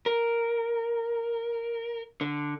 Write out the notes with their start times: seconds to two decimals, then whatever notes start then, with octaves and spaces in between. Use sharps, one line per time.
0.06 A#4
2.21 D3